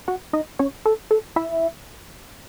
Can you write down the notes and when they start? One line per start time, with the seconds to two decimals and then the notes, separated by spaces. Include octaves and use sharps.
0.08 F#4 F#5
0.33 D#4 D#5
0.59 C#4 C#5
0.86 A4
1.11 A4
1.36 E4 E5